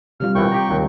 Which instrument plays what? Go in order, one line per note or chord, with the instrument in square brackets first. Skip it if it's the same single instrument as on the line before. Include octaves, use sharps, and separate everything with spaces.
[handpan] C3 G3 F4 [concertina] F6
[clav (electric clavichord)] C2 B2 E3 [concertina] G5 C#6
[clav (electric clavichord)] G4 A#5
D#2 F#3